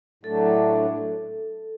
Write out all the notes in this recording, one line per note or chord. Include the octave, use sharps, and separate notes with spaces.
A2 F#3 A3 D4 A4